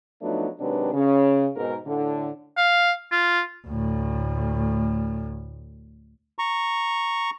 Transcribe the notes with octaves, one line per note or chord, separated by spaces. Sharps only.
F3 F#3 A3 B3 D4 D#4
C3 D#3 F#3 G#3 D4 B4
C#3
G#2 B2 A#4
A2 D3
F5
F4
D2 A2
A#5 C#6